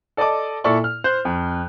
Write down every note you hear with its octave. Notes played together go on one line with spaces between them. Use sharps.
A4 D5 D#5 A5 D6
A#2 E4 A4 D5 C#6
F6
C5 F#6 G6
F2